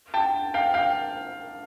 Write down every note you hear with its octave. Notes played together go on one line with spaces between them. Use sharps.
G5 A5
F5 G5
F5 G5